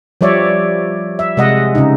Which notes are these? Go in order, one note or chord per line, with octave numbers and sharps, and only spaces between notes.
F3 G3 C#5 D5 E5
E5
C3 G#3 D#5 F#5
C#3 D#4